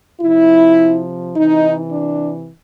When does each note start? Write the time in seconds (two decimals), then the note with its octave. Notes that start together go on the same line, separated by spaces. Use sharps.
0.21 C3 F3 E4
1.35 C3 E3 D#4
1.92 D4